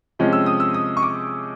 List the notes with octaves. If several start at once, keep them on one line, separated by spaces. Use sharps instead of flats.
C3 F3 G#3 C#4
E6
D#6
E6
D#6
C#6
D6